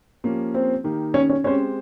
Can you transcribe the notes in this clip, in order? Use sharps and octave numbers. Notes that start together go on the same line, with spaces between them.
F3 A#3 C#4 G4
C4
D#3 A#3 D#4 G4
C#4
C#4
G#3 C4 C#4 G4 C5